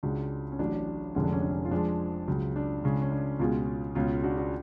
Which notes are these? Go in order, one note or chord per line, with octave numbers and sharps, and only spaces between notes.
C#2 C#3 G#3 D4 F#4
C#4
A1 A2 F#3 D4
F1 F2 D3 G#3 C#4
D4
C#4
D4
C#4
F4
F2 F3 G#3 D4
C#2 C#3 F#3
D4
C#2 C#3 G#3
C#4
D4
C#2 B2 G#3 C#4 F4
C#2 B2 G#3 C#4 F4
D4 F#4
D4 F#4